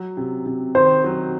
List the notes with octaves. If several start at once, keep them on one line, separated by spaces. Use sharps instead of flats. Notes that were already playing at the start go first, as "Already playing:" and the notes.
Already playing: F#3
C3
C3
D#3 C5
F#3